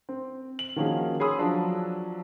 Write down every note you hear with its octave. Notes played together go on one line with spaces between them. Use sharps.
C4
F#7
D#3 F3 A#3 C#4 F#4 G#4
G#4 C#5 B5 C6 D#6 E6
F3 F#3 D4